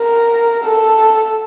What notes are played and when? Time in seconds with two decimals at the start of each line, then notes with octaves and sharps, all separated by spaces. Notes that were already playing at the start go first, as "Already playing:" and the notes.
Already playing: A#4
0.64 A4